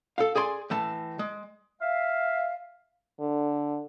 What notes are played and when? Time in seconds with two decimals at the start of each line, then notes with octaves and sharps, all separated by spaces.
0.18 A4 F5
0.35 G#4 D5 G#5 C6
0.70 A2 E3 A5
1.19 G#3
1.81 E5 F5
3.20 D3